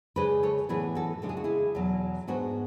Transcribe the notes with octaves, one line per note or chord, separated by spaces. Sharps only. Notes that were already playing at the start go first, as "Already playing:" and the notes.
C#3 G#3 D4 G#4 B4
A4 C#5
A2 E3 B3 D4 G#4 B4
F#4 A4
C#3 G#3 D4 A4
G#4
F#4
E4 G#4
E2 B2 F#3
G#2 G#3 B3 D4 F#4